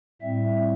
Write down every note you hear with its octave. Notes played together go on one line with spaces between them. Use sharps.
A2 G3 C4 E5